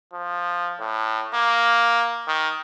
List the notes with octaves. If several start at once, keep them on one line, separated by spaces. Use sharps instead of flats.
F3
A2
A#3
D#3